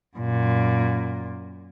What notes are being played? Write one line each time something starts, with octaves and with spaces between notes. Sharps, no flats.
F#2 A#2